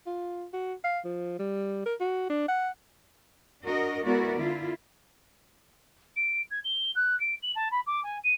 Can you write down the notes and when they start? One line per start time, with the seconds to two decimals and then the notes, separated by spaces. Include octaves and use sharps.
0.06 F4
0.53 F#4
0.84 F5
1.04 F3
1.39 G3
1.86 A#4
2.00 F#4
2.29 D4
2.48 F#5
3.63 D4 F#4 A#4 D#5
4.03 G#3 B3 E4 F#4 A#4 D5
4.36 D3 E4 F4
6.16 D7
6.51 G#6
6.64 G7
6.95 F#6
7.20 D7
7.43 F#7
7.55 A5
7.71 B5
7.86 D6
8.03 G#5
8.24 D#7